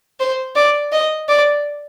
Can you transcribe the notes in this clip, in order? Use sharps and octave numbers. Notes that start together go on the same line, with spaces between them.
C5
D5
D#5
D5